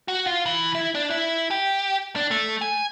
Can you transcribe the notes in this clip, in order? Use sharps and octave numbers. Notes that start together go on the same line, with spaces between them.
F#4
F4
E3
E4
D4
E4
G4
D4
A3
G#5